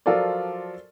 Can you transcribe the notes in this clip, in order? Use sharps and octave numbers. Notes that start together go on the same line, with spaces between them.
F3 F#3 F4 A4 A#4 D5